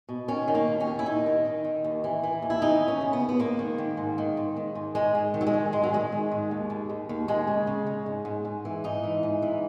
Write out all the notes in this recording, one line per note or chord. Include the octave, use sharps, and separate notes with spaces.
B2
D#3 C#4
D#3
A#3
D#2
C#4
D#2
E4
D#2 D#4
D#3
D#3
D#3
D#2
E3
E3
D#2
E4
E3 D#4
D#2
C#4
C#3
B3
D#2
B3
G#2 A#3
D#3
D#3
G#2
D#3
G#2
D#3
G#2
G#2 G#3
G#2
D#3
F#3
G#3
D#3
G#2 G#3
F#3
D#3 G#3
D#3
G#2
D#2
D#2
D#2
D#2
D#2 G#3
C#3
C#3
C#3
G#2
G#2
G#2
E3
G#2 D#4
E3
G#2
E3